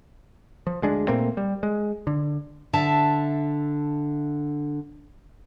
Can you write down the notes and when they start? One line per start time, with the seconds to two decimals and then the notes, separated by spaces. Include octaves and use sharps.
0.67 F3
0.82 D2 G#3 D4
1.08 A#2 A3 A#3 C4
1.37 G3
1.63 G#3
2.07 D3
2.73 D3 E5 A5